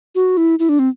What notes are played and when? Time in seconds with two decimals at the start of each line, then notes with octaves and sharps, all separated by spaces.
0.15 F#4
0.37 E4
0.59 E4
0.69 D4
0.79 C4